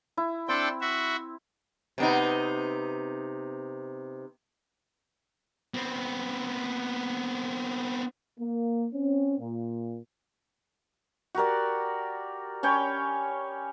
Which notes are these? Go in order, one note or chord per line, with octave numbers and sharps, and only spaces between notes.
E4
C4 D4 A4 G5
F#4 E5
C3 B3 D#4
B3 C4
A#3
C4 C#4
A#2
F#4 G4 A#4 D5
C#4 C#5 G5 B5